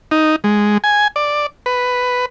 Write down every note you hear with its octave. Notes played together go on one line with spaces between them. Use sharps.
D#4
G#3
G#5
D5
B4